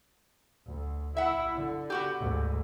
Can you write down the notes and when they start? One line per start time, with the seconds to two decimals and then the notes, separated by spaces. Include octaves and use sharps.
0.66 D2
1.17 E4 E5 F#5
1.55 D3
1.90 B3 F#4 G4
2.19 D2 G#2